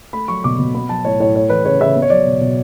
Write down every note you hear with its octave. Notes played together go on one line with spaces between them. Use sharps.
A3 B5
F#3 C#6
B2 D6
B2
B3 B5
F#3 A5
A2 C#5
A2 C#5
A3 C#5
E3 B4
C#3 C#5
C#3 E5
B3
C#5
F#3 D5
B2
B2